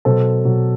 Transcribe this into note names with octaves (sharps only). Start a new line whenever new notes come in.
B2 F#3 A4 C5
B2 F#3